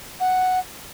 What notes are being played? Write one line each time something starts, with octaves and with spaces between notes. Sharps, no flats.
F#5